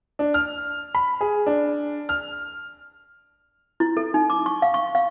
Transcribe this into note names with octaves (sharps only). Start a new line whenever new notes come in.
D4
F6
B5
G#4
D4
F6
E4
A4
D#4
D6
C#6
F5
C#6
F5